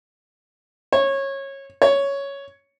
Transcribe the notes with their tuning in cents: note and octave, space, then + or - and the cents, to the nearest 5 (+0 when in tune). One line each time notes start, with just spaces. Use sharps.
C#5 -20
C#5 +5